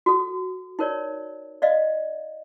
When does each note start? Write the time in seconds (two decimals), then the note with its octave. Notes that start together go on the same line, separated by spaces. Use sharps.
0.06 F#4 A4
0.79 D#4 A#4 C#5 D5
1.62 D5 D#5 F5